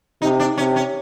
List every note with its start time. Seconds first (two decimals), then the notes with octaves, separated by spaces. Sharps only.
0.22 C3 D#4
0.39 D4
0.57 C3 C#4
0.76 C#4